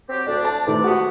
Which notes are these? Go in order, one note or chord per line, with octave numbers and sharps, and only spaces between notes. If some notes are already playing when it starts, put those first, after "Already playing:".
F#3 C4 G4
D2 D4 D5
A5
C3 D#3 A3 B4 D5
G#2 A3 B3 F#4 G4